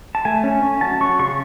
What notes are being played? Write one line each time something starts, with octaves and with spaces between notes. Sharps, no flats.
A5
A3 G#5
C#4
C#4
F#3 A5
F#3 C#6
C#3 C#6